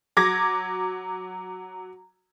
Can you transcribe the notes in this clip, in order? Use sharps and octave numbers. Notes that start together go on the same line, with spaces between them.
F#3 D6 G#6 A#6